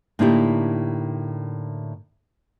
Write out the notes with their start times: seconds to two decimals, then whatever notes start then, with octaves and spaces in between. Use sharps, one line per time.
0.19 A2 D3 A#3 D#4 E4 G4